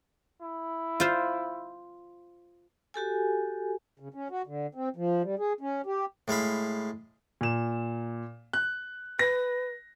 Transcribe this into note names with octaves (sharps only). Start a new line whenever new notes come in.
E4
F4 C5
F#4 G4 A4 G#5
C#3
C#4
F#4
D3
C4
F3
G3
G#4
C#4
G4
A2 G#3 F5 B5
A#2 E7
F#6
B4 A#6